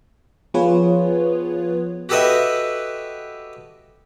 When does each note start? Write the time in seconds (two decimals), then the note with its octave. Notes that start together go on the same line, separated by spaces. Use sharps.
0.54 F3 B3 F4 G#4 B4 C#5
2.09 F#4 G4 A4 B4 D#5 E5